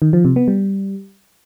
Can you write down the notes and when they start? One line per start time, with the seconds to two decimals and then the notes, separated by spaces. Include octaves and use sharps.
0.02 D#3
0.13 F3
0.25 C3
0.36 B3
0.48 G3